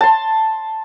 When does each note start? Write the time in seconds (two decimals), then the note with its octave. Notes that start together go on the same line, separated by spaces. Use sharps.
0.01 A5 C6